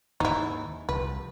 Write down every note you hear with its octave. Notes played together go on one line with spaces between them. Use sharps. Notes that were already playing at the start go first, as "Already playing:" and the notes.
D#2 G#2 C3 D#4 E4
C2 F3 B4